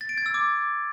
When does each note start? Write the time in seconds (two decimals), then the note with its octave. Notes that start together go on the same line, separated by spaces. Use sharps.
0.01 A6
0.09 D7
0.18 G#6
0.26 E6
0.34 D6